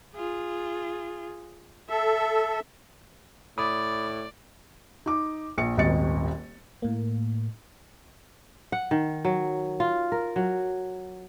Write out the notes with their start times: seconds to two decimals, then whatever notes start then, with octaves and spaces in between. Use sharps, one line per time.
0.15 F4 G#4
1.90 A4 E5
3.58 A2 D5 B5 D6 D#6
5.06 D#4 D6
5.58 A#1 C#7
5.77 D#1 G#1 D#2 D#5 A6 C#7
6.82 A2 A#3
8.72 F#5
8.91 D#3
9.25 F#3
9.80 F4
10.12 A#4
10.36 F#3